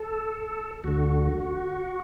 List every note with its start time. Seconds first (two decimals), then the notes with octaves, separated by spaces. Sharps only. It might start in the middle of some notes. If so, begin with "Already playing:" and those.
Already playing: A4
0.84 D2 D3 F#4